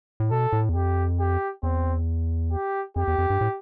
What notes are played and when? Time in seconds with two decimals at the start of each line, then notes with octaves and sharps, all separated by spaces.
0.20 A2
0.31 B2 A4
0.53 A2
0.69 E2
0.75 F2 G4
1.20 G4
1.63 E2 C4
2.52 G4
2.96 F2 G4
3.07 E2
3.18 F2
3.30 G2
3.41 A2